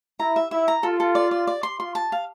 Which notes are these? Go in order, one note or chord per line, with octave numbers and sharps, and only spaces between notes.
E4 A#5
E5
E4 E5
A#5
F4 A4
A4
D5
D5
D5
C6
F4 C6
A5
F5